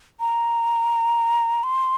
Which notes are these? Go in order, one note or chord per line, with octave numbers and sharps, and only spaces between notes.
A#5
C6